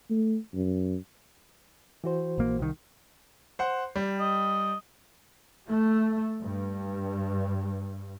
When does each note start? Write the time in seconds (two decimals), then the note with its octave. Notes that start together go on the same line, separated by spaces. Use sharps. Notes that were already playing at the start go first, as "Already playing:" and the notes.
0.10 A3
0.54 F#2
2.04 E3 F#4 C5
2.38 A#1 A#3
2.59 C2 D#3
3.59 C5 F#5
3.96 G3
4.20 D#5
5.69 A3
6.41 G2